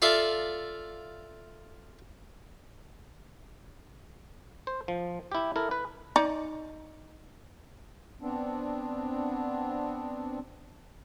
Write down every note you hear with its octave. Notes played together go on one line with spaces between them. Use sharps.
F4 A4 D5 E5 F5
C5
F3
E4 G4
E4 A4 A#4
B4
D#4 D5
B3 C4 D4